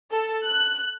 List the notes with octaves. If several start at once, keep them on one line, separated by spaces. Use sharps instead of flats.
A4
F#6